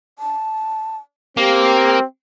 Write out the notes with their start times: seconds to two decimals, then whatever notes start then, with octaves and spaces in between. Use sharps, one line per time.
0.19 A5
1.37 A#3 C4 G4